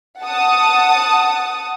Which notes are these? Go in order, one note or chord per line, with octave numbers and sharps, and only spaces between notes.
F#5 A5 D#6